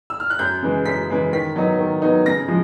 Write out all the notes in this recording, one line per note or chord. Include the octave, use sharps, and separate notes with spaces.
E6
F6
F#6
F#2 G6
C#3 E3 G#3
F#2 B6
C#3 E3 G#3
D#3 B6
F#3 B3 D#4
D#3
F#3 B3 D#4
C#3 A#6
F3 G#3